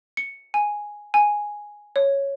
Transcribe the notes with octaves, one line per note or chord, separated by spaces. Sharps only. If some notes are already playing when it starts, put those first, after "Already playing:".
C#7
G#5
G#5
C#5